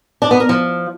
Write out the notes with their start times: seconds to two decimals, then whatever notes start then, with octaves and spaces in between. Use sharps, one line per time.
0.22 D4
0.31 B3
0.40 A#4
0.49 F3